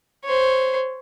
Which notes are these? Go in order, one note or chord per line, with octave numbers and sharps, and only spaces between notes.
C5 C#5